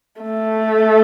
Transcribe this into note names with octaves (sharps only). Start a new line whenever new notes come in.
A3